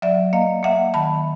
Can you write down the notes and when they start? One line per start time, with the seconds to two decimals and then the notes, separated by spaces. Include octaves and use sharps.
0.02 F#3 D5 E5
0.33 A#3 D#5 F5
0.63 A#3 E5 F#5
0.94 D#3 A5 B5